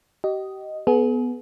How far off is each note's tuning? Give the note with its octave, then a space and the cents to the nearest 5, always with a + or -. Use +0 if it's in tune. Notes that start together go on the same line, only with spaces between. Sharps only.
G4 -35 D#5 +0
B3 +0 G#4 +40